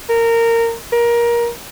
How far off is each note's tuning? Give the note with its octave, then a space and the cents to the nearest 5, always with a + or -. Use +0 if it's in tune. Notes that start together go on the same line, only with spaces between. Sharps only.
A#4 -15
A#4 +20